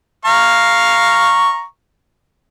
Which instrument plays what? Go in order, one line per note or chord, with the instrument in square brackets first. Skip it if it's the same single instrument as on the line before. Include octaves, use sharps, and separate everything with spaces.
[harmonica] F5 A#5 C#6